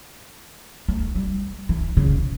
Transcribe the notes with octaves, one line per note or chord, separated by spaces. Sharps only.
A3
G3
E3
C#3